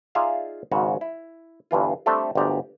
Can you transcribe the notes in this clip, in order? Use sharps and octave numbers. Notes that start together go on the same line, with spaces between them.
D#4 F4 G#4 D5 E5 F5
G#1 G#2 C#3 F#4 C#5
E4
G1 G2 E3 F4
G3 A3 C4 D4 G4 A4
G1 D2 G#3 G4 D5 A#5